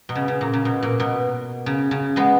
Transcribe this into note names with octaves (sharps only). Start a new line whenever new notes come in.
B2
C#3
C#3
A#2
C#3
B2
A#2
B2
C#3
C#3
G#3 B3